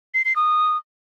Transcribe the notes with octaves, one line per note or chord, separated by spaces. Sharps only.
C7
C7
D#6